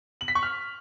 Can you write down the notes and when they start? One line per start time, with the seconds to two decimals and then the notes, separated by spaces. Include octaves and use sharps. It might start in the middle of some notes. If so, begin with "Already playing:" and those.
0.21 F#7
0.28 B6
0.35 C#6
0.43 F6